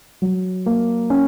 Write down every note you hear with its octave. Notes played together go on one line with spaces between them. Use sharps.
F#3
A#3
C#4